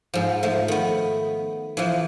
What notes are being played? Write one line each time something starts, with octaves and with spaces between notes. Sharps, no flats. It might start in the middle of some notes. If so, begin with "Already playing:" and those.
G#2 F3
F3 A3
D#3 B3
E3 F3